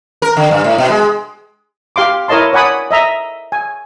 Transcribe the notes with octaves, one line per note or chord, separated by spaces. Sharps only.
A#4
D3
G2
A2
B2
G#3
G4 F5 C6 D6
E4 A#4 C#5 D#5 A5 C6
C#5 D5 F#5 G#5 B5 D#6
D#5 E5 A#5
G#5